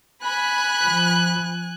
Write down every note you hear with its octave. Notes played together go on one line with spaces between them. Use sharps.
G#5 B5 F#6
F3